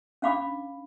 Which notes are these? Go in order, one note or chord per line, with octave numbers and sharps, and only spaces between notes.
C#4 D4 F5 B5 D6